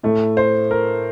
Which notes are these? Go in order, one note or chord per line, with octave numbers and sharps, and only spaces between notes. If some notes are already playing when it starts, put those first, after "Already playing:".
A2 A3
C5
A#4